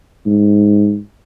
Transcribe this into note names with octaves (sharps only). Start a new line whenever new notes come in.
G#2